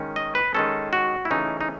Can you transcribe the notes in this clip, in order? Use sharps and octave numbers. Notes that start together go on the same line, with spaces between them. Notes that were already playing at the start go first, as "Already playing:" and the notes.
Already playing: D#3 G#3 C#4
D#5
B4
D#3 G#3 C#4 A4
F#4
E4
C#3 E3 A3 C#4 D#4
D#4